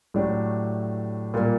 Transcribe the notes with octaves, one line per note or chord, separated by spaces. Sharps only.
A2 F#3 A3 D4 G4
A#2 G3 A#3